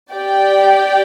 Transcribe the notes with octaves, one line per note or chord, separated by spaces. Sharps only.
G4 D5 G5